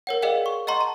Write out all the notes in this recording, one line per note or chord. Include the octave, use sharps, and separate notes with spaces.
A#4 C#5 F#5
G#4 A#4 D5 D#5 F5 G5
C#6
D#5 F#5 A#5 C6 C#6
A5